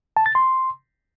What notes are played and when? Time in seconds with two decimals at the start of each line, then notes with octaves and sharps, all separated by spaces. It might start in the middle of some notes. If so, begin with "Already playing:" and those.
0.17 A5
0.26 A6
0.35 C6